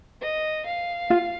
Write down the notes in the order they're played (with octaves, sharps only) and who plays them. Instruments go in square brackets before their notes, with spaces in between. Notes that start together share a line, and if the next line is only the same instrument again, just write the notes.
[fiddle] D#5
F5
[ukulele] F4